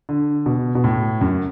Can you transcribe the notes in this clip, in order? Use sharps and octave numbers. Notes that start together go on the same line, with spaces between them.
D3
B2
B2
A2
F#2